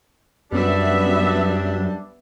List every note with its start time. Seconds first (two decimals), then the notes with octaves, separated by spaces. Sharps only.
0.52 F#2 G3 B3 D4 E5